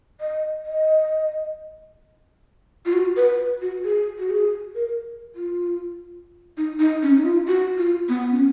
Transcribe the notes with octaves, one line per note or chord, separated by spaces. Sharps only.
D#5
D#5
F4
F#4
B4
F#4
G#4
F#4
G#4
A#4
F4
D#4
D#4
C#4
D#4
F4
F#4
F4
B3
C#4